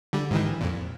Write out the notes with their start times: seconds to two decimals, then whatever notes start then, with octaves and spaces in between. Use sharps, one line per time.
0.13 D3 G3
0.31 G#2 D#3 E3
0.61 F2 A#2